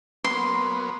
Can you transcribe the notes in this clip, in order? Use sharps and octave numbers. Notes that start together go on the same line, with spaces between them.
F#3 A#3 B3 C6